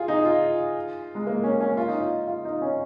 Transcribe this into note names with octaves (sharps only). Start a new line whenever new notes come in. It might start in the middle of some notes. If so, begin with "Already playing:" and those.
Already playing: F4 G#4
D#4
F4
G#3
A#3
C#4
C#4
F4
D#4
F4
F4
D#4
C#4